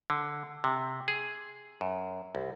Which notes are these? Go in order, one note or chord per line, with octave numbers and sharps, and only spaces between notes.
D3
C3
G#4
F#2
C2